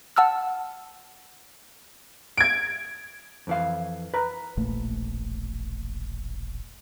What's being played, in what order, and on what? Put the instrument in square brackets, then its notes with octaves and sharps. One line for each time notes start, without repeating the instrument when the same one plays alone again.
[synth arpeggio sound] F#5 A5 E6 F6
[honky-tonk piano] G#6 D7
[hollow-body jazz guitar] F2 E3 F5
B4 A#5
[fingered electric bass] E1 A#1 A#2 A3